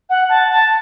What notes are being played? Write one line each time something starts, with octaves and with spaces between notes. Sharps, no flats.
F#5
A5
A5